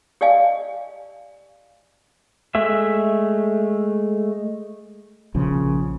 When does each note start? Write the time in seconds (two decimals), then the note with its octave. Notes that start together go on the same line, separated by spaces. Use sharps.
0.21 G4 D5 D#5 F5 G#5
2.55 G#3 A3 E5
5.34 A#1 C#3 F3